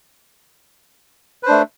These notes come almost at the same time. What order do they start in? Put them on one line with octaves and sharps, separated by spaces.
B4 C5 D4 A3